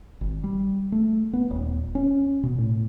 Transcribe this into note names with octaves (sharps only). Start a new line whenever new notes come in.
G#1
G3
A3
B3
D#1
C#4
B2
A2